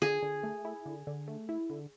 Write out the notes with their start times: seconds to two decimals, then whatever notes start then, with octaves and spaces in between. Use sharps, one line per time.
0.02 D3 G#4
0.23 D3
0.43 A3
0.65 E4
0.86 D3
1.07 D3
1.28 A3
1.49 E4
1.70 D3